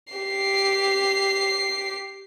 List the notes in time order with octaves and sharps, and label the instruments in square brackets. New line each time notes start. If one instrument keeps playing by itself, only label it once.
[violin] G4 C7